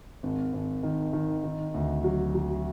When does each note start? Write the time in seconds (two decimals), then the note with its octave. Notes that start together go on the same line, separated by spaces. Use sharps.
0.23 G#1
0.53 G#1
0.83 D#3
1.13 D#3
1.44 D#3
1.74 D2
2.04 F#3
2.35 F#3